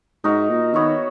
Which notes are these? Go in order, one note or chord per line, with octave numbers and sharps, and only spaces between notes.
G#2 D#4 F#4 A#4 E5
A#2
D#3 B3 F#4 C#5 E5